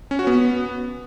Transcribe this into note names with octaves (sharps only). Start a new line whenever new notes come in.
C#4
F#4
B3